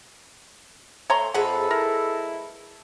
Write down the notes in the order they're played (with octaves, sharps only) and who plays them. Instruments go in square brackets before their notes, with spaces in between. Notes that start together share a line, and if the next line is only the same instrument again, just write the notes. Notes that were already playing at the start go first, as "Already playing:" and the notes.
[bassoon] A3 [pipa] C#5 A#5 C6
[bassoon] F2 [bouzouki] G#3 B4 E5 [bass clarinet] A4 [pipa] F#5
[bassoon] E4 [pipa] A#4